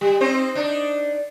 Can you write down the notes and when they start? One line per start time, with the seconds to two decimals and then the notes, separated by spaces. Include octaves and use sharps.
0.01 G3
0.20 C4 D#4 C5
0.55 D4 D#4